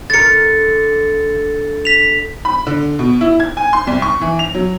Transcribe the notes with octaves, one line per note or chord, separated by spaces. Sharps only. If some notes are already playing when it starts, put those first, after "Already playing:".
D3 A#4 A6 C#7
B6 F7
B5
D3
B2
E4
G#6
G#5
C6
C2
C#6
E3
F7
F#3